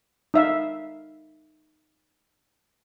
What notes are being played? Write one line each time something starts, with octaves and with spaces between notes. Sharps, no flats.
D#4 E5 F5